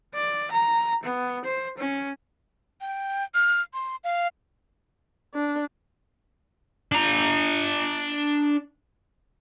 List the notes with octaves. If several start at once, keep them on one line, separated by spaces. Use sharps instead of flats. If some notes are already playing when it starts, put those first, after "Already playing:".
D5
A#5
B3
C5
C#4
G5
F6
C6
F5
D4
D4 A#5